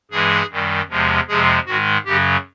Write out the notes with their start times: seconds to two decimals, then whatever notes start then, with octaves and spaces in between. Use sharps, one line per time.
0.11 G2 E3 G#3 G#4
0.51 F#2 D#3 G3
0.89 E2 C3 F3 G#3
1.28 F2 C3 F3 G#3 G#4
1.66 G#2 D#3 G#3 F#4
2.05 F#2 C#3 F#3 G4